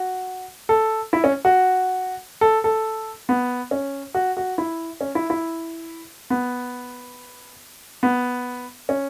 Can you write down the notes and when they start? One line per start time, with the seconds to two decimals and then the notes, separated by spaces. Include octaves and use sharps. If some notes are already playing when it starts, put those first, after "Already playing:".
Already playing: F#4
0.69 A4
1.13 E4
1.24 C#4
1.45 F#4
2.41 A4
2.64 A4
3.29 B3
3.71 C#4
4.15 F#4
4.37 F#4
4.58 E4
5.01 C#4
5.15 E4
5.30 E4
6.30 B3
8.03 B3
8.89 C#4